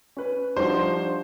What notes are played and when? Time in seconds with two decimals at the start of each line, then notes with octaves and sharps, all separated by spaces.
0.17 C#4 B4
0.57 F3 G3 D4 D#4 F#4 C5